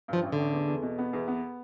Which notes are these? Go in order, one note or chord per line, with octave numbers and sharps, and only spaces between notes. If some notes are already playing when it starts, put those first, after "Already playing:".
G2 F3
A1
D3
A1
E2
E2
B2
B3
E2
B3